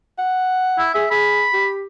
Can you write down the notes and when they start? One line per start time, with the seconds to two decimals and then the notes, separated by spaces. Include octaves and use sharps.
0.18 F#5
0.78 E4
0.95 G#4 E5
1.11 G#4 B5
1.54 G4